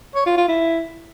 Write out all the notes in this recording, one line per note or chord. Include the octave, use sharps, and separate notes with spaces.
C#5
F4
F4
E4